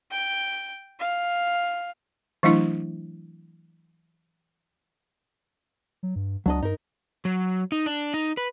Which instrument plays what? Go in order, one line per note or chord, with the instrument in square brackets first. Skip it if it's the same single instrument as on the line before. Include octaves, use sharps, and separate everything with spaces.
[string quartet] G5
F5
[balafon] E3 F#3 A3 D4 E4
[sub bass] F#3
G2
[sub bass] C#2 [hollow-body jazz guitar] F#3 D4 D#5
[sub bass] G2 [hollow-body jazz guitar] D#4 A#4
[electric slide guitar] F#3
D#4
D4
D#4
B4